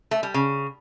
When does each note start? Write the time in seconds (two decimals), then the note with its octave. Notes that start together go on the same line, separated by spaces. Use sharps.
0.11 A3
0.23 G3
0.34 C#3